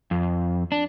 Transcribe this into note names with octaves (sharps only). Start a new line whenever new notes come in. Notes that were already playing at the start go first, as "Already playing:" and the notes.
F2
D4